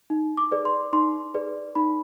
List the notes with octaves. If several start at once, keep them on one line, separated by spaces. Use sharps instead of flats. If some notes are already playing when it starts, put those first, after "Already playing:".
D#4
D6
G#4 B4 D5
C6
D#4 C6
G#4 B4 D5
D#4 B5